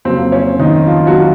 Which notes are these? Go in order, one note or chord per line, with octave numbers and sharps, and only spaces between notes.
F2 C#3 F#3 A#3 C4
C#4
D#3 D#4
F3 F4
F#3 F#4